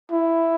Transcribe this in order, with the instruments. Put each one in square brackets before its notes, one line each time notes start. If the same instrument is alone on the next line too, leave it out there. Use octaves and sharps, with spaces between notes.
[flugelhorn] E4